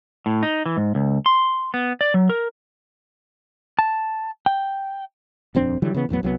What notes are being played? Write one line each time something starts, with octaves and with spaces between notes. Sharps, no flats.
A2
D#4
E3
G#2
C#2
C6
B3
D5
F#3
A#4
A5
G5
D#1 F2 C4 D4
D3 E3 F#3 G3
C#3 E3 B3
A1 E2 F#3 B3
C2 F#3 A3 B3